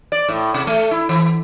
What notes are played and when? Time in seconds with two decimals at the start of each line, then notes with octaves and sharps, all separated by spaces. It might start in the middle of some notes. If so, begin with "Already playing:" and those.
0.12 D5
0.29 A2
0.54 C3
0.67 A3
0.91 E4
1.09 E3